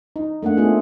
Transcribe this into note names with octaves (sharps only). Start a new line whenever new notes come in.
D#4
A3 A#3 D4 F#5
A3 B3 C4 F4 G#4